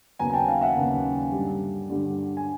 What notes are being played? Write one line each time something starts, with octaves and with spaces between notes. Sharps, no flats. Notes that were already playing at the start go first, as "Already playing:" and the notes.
D#2 C#3 F#3 B3 G#5 A#5
G#5
G5 A5
F5 G5
E5 F#5
D#2 C#3 F#3 B3
G2 D3 G3
G2 D3 G3
G#5